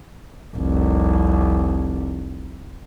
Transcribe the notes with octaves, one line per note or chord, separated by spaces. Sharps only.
F1 C2